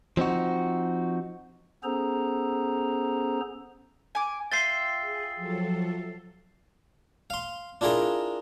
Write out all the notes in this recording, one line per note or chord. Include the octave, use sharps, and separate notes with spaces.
F3 C4 D#4 F#4
B3 C#4 G#4 A4 C5 A#5
G#5 D6
F4 E5 G5 A6 C7 G7
G#4
F3 F#3 A4
F5 C6
D4 E4 F4 G#4 A#4